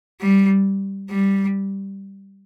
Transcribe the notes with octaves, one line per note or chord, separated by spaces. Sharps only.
G3
G3